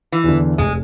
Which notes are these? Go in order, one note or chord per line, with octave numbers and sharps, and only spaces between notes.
E3
E2 D3
F1 G#3